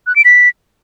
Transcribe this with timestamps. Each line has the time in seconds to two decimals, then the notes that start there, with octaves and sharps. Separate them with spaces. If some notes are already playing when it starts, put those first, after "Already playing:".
0.07 F#6
0.16 D7
0.25 B6